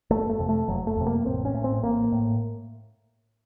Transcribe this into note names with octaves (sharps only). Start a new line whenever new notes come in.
F#1 A3
A3
F2 C3
A3
F#1 F#3
A3
F2 C3
A#3
A1 C4
C#4
A2
C4
A1 A#3
A2